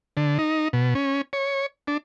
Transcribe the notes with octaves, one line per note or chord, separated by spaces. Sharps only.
D3
D#4
B2
C#4
C#5
D4